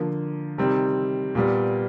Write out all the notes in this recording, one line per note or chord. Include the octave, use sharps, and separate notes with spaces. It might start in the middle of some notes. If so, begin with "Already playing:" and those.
Already playing: D3 F3 A#3
C3 D#3 G3 C4
A#2 G3 B3